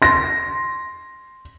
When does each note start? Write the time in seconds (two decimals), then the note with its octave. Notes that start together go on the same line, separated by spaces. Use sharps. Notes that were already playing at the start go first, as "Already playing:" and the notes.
0.02 C6 A#6